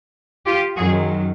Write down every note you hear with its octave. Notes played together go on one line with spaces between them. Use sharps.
F4 G4
F#2 D#3 F#3 F#4 G#4